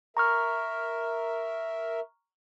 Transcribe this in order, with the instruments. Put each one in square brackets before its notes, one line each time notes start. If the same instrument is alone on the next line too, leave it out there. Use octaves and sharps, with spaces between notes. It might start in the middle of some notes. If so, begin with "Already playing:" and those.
[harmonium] A#4 E5 [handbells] A#5 C#6 F6